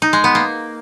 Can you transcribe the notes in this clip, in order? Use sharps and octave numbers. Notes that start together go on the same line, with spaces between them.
D#4
G#3
B3
A#3